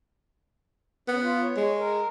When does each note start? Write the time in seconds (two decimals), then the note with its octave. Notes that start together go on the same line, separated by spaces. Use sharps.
1.08 C#3 B3
1.23 F4
1.42 C#5
1.57 G#3
1.79 A#4